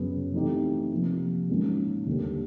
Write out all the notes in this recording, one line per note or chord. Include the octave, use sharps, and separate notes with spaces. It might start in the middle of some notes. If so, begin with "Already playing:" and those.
Already playing: F#2 C#3 F#3 B3
E3 A3 C4 D#4 G4
C3 F3 A#3
G#2 D#3 F#3 A#3 C#4
D#2 D3 G3 A#3